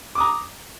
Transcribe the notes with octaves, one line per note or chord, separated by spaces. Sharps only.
A#5 D6 D#6